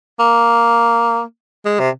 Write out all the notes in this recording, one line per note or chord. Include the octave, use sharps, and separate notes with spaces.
A#3
G#3
C3